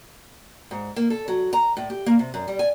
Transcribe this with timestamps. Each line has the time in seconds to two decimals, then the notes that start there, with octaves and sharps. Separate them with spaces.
0.71 G#2
0.96 A#3
1.10 A4
1.28 F#3
1.53 A#5
1.77 A2
1.90 G4
2.06 A#3
2.19 C3
2.34 F#2
2.48 G3
2.59 G#5